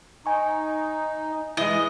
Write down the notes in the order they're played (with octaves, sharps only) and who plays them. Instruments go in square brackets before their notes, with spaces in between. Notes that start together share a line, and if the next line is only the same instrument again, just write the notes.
[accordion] D#4 [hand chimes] G#5 C#6
[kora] E3 G#3 [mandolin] D#5